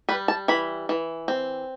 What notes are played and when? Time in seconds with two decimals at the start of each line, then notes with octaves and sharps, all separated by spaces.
0.09 G3 B4
0.28 A5
0.48 E3 B5
0.89 E3
1.28 C4